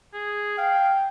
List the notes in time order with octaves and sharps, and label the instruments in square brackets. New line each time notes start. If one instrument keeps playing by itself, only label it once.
[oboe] G#4
[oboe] F5 [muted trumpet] G5